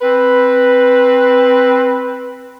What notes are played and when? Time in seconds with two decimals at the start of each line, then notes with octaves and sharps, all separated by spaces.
0.01 C4 B4